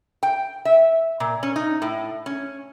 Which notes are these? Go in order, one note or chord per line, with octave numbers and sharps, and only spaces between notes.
G5
E5
A#2
C#4
D#4
A2
C#4